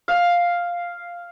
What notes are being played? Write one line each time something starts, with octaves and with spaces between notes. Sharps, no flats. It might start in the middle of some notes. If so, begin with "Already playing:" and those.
F5